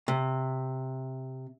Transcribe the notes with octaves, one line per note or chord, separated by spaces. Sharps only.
C3